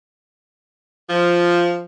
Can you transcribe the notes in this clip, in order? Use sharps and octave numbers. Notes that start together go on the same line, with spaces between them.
F3